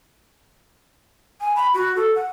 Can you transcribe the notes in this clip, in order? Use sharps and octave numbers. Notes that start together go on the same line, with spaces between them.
G#5
B5
F#4
A4
F#5